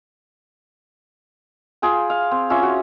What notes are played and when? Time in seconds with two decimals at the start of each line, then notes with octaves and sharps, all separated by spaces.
1.82 F4 G#4 G5
2.10 F5
2.31 C4
2.50 C#4 F4 E5 D6
2.62 F#4